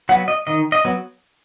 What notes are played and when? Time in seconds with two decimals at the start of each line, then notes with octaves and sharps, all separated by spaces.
0.09 F#3 B3 F#5
0.28 D#5
0.47 D#3 D#5
0.72 D#5
0.85 F#3 B3